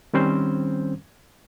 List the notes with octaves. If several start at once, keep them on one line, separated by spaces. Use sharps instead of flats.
D#3 G3 C4 C#4 C5